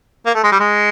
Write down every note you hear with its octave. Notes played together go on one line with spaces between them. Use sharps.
A#3
A3
G#3
G3
G#3